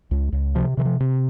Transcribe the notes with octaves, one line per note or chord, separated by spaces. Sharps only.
C#2
C#2
C3 F3
C3 E3
F3
C3